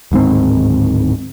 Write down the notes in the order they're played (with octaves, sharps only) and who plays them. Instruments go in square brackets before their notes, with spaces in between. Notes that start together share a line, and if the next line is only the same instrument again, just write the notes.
[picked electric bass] D1 G#2 D#3 C4